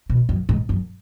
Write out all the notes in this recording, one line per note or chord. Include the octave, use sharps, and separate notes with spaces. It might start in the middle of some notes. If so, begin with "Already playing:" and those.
B2
F#2
G#2
F#2